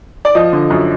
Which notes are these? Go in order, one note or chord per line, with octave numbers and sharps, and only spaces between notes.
D5
F3 D#5
D3
F#2